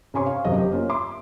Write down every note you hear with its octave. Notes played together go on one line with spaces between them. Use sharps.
C3 C#4 G#5 C6 C#6
F5
F#1 F#2 C3 D#5
G4
A#3 C#4 F4
E5 C6 D6